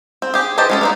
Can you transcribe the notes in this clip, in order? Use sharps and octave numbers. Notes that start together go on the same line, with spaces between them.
C4
G4 G#4
E3 G4 C5 D#5 A5
G#3 C#4 A4
A#3 B3 D#4